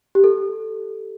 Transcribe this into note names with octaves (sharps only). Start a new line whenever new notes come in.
G4
A4